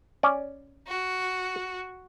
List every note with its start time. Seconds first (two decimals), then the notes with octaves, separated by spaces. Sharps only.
0.23 C#4 D5
0.88 F#4